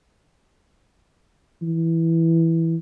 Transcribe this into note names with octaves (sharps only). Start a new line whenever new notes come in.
E3